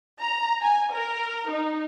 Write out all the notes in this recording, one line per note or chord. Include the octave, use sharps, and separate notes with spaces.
A#5
G#5
A#4
D#4